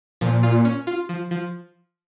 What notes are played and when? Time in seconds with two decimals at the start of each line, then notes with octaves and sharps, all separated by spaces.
0.21 A#2 F3
0.43 F4
0.65 C#4
0.87 F4
1.09 F3
1.31 F3